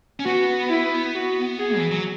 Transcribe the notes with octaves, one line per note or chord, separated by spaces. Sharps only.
C#4
B3 F#4
E4
F#4
G#4
E3
F#3